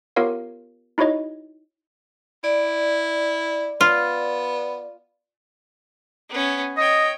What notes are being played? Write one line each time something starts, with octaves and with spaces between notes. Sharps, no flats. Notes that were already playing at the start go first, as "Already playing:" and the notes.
B3 F4 G4 A#4 C#5 F5
D#4 E4 F#4 C#5 D#5
E4 D5
B3 F4
B3 C#4
C#5 D#5 G5